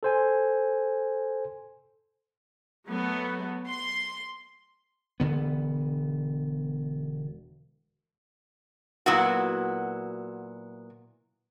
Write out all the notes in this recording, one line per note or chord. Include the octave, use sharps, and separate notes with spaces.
A4 C5 G#5
F#3 A3 B3
C6
E1 D3 B3
A#2 F#3 B3 E4 F#4